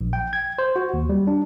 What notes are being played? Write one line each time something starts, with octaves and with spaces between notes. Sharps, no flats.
A#1
G5
G#6
C5
F#4
D#2
G3
D4